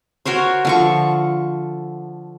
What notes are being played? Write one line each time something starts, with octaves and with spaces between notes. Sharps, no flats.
F#4 A#4 C5 C#5
D3 F3 C#6